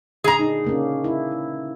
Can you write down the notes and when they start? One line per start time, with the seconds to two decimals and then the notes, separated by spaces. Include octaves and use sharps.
0.24 A#2 D3 G#4 A#5
0.39 D#4
0.64 C#3 A#3 C#4
1.04 E4